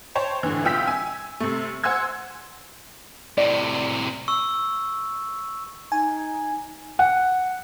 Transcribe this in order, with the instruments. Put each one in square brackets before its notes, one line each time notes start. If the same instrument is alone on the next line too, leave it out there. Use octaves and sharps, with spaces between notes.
[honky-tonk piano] C5 C#5 G5 A5
A2 D3 E3
C2 B2 F4 G5 E6 B6
G#5
C3 A3
C5 F#5 G#5 C6 E6 G#6
[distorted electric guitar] A2 C3 [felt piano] D5
[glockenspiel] C#6 E6
[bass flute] D#4 [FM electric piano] G#5
[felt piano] F#5